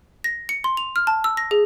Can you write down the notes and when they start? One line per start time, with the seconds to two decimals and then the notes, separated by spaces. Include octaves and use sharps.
0.24 A#6
0.49 C#7
0.64 C6
0.77 F7
0.96 F6
1.07 A5
1.24 E6
1.37 A#6
1.51 G#4